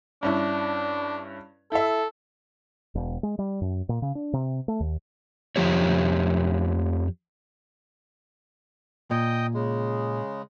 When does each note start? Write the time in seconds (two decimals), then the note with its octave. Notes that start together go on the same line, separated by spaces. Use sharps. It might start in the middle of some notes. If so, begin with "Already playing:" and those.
0.23 G2 C#4 D4 E4
1.72 E4 A4 E5
2.95 E1
3.23 G#3
3.39 G3
3.61 F#2
3.89 A#2
4.02 C#3
4.15 D4
4.33 C3
4.68 A3
4.80 D#2
5.56 F2 F3 G4 C#5
9.11 A#2 D#5 G5 D#6
9.54 C#3 G#3